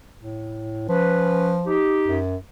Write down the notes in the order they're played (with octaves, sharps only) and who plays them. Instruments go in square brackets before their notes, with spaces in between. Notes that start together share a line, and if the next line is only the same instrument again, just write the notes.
[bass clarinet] A2
[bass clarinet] F3 [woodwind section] C#4 B4
[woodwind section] D#4 G4
[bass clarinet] F#2